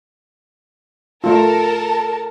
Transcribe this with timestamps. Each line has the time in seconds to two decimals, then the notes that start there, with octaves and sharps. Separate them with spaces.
1.24 A3 F4 A4 A#4 A5